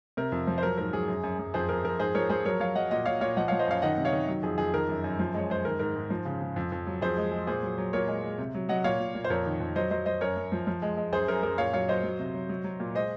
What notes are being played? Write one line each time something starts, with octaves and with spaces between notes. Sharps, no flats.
C3 A#4
F2
F3
C5
F#3 A#4
G#2 A#4
F#3 G#4
F#2
F#2
F#2
F2 G#4 C5
F2 A#4
F2 A#4
G#2 G#4 C5
F3 A#4 C#5
F3 G#4 C5
F#3 A#4 C#5
F#3 C#5 F5
F#3 D#5 F#5
A#2 D#5 F#5
A#2 C#5 F5
A#2 C#5 F5
F3 D#5 F#5
F3 C#5 F5
C5 D#5
F#2 C#5 F5
D#3 D#5 F#5
C3
C#5 F5
D#3
F#3
F2 G#4
F2 G#4
D#3 A#4
F#2
F#2
F3
G#3 C#5
G#3 C5
D#3 A#4
G#2 A#4
G#2
F3
C#3
C#3
F2
F2
F#3
F2 G#4 C5
G#3
G#3
A#2 G#4 C5
F#3
F#3
A#2 A#4 C#5
G#3
G#3
C3
F#3
F#3 D#5 F#5
A#2 C#5 F5
A#2
A#2
C5
F2 A#4 C#5
D#3
F2
F#3 C5 D#5
F#3 C5 D#5
F#3 C5 D#5
F#2 A#4 C#5
F#2
F3
F3
G#3
G#3
F#2 G#4 C5
F#2 A#4
F#2 A#4
A#2 C#5 F5
F#3 C#5 F5
F#3 C5 D#5
F#3
C3
F#3
F#3
F#3
A#2
G#3 C5 D#5